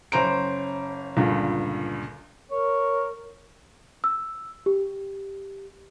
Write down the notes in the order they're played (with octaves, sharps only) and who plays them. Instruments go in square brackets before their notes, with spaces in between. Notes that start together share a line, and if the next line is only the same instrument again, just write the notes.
[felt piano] F#1 C#4 C5 A#5 D7
C#2 G2 A#2 D3
[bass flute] A#4 [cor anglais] C#5
[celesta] E6
G4